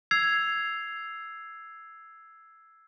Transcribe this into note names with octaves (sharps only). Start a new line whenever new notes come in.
E6 G#6 C7 F7